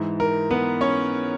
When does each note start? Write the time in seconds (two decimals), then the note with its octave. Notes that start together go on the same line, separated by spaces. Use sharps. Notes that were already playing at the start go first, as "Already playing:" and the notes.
Already playing: G#2 E3
0.20 A#4
0.51 B3 B4
0.81 C#4 C#5